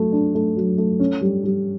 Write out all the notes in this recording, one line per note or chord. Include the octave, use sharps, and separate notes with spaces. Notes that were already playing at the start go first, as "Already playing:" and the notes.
Already playing: F#3 A3
D4
A3
F#3
A3
C#4
G3
G3